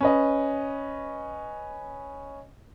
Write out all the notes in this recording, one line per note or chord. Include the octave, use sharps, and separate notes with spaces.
C#4 B4 D#5